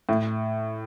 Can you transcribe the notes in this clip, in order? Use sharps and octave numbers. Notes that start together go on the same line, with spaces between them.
A2